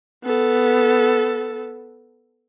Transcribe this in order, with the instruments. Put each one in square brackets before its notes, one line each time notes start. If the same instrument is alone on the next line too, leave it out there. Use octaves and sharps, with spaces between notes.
[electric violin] B3 A4